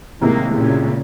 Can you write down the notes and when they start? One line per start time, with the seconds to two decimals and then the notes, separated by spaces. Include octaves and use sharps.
0.21 A2 C3 D#3 G#3 A#3
0.56 A#2 C#3